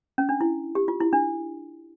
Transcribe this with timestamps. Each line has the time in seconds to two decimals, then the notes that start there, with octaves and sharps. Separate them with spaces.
0.18 C#4
0.29 D4
0.41 E4
0.75 G4
0.88 F4
1.01 E4
1.13 D4